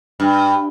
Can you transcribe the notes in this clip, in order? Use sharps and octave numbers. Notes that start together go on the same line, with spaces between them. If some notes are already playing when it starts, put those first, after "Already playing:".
G2